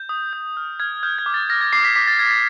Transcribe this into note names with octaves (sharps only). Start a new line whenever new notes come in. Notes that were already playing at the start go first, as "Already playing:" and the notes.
Already playing: G6
D#6
G6
F6
F6 G#6
F6 G6
G#6
D6
A6
F6 A#6
G#6
D6 C7
B6
D6 B6
A6
F6 G#6
A6